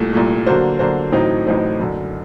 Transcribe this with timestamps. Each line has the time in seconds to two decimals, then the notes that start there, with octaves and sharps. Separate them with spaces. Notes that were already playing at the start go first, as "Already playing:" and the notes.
Already playing: C2 A#2 A3
0.13 C2 A#2 A3
0.46 D3 F#3 A#3 F#4 C5
0.79 D3 F#3 A#3 F#4 C5
1.12 A1 A2 F#3 C4 D#4
1.46 A1 A2 F#3 C4 D#4
1.79 F#1 F#2 D3